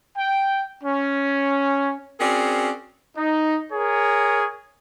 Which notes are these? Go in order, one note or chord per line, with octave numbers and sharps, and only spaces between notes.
G5
C#4
C4 C#4 F#4 G#4 A#4 D5
D#4
G#4 A#4 C#5